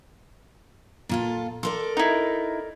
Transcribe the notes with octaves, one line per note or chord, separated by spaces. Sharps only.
A#2 F4 A4
A4 A#4 D5 C6
D#4 E4